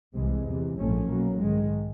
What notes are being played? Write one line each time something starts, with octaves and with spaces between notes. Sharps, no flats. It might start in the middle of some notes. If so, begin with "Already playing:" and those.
C2 C3 E3 G#3
E2 C3 E3
A#1 G#2 F3 A3 C#4
B1 B2 F#3 A#3
G#2 D#3 G#3